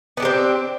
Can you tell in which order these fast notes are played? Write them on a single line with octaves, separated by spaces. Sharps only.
B3 D4 G4 C4